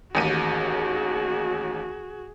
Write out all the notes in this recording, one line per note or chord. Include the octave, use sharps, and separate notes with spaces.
A1 D#2 F#4 G#4 D#7